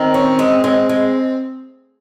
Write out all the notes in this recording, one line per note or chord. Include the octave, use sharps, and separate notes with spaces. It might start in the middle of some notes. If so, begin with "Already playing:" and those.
Already playing: D#3 C4
C#4
G#3
G#3 C4
G#3